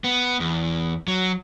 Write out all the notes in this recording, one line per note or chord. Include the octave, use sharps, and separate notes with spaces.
B3
E2
F#3